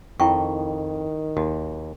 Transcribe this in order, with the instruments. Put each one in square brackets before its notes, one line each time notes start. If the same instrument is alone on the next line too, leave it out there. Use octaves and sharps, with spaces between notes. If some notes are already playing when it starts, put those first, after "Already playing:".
[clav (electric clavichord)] F2 [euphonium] D#3 [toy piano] E4 G5 C#6
[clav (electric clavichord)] D#2 [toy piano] F#4